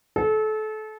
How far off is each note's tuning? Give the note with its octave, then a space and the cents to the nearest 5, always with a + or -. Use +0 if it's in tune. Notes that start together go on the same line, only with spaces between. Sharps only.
A4 -30